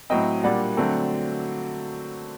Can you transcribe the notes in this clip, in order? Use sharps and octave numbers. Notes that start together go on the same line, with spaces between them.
A2 F#3 C4 D#5 G5
A#2 G3 D4 D5 F#5
D3 F#3 A3 C4